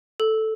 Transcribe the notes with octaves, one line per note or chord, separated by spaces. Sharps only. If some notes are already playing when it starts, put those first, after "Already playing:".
A4